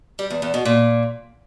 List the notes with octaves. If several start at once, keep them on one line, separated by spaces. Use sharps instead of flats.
G3
E2
E2
B2
A#2